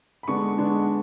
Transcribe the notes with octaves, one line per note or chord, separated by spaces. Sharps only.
B5
D3 G#3 B3 D4 C#6
D3 G#3 B3 D4